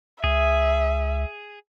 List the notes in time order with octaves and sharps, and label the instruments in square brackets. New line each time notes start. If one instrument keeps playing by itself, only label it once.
[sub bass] C#2 [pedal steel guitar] G#4 [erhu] E5